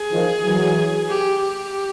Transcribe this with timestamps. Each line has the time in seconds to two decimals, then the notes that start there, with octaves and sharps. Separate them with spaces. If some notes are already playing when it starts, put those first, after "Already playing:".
Already playing: G#4
0.12 D#3 F3
0.44 E3 F#3
1.08 G4
1.40 G4